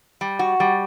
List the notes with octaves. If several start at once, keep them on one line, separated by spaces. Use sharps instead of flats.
G3
F#4
G3